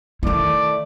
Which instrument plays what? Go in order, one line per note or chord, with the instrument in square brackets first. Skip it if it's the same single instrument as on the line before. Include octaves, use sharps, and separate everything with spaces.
[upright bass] D#3 E4 [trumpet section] A3 D5